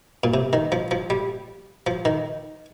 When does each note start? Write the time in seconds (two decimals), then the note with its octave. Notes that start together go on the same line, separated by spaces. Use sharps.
0.24 A#2
0.34 C3
0.53 D#3
0.72 F3
0.91 F3
1.10 G3
1.87 F3
2.05 D#3